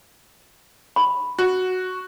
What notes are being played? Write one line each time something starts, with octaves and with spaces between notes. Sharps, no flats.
B5
F#4